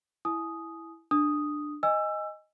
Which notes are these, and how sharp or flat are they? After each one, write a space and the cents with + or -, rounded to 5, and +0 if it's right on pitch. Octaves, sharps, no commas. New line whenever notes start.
E4 +0 G#5 +30 D#6 +0
D4 +15 D#6 +0
D#5 +0 G#5 -20 E6 +20